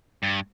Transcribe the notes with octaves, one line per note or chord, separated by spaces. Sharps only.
G2